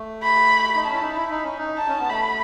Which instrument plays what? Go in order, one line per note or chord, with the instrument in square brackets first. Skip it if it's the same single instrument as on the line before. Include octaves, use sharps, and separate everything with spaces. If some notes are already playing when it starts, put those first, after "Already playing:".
Already playing: [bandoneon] A3
[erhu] B5
[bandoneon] D#4
[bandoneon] C#4 [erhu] A5
[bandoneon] E4
D#4
[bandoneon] E4 [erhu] B5
[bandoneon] D#4
C#4
D#4
[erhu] A5
[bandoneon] C#4
B3
[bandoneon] A3 [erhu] B5